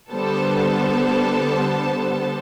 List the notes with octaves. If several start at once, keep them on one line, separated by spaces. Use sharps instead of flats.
D3 G3 B3 A4 C5 A5